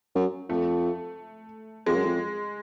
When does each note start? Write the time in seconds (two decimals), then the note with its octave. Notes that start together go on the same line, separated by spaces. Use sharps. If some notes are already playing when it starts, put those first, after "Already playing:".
0.15 F#2
0.49 F2 A3
1.86 F2 G#3
1.96 F#2
2.05 F2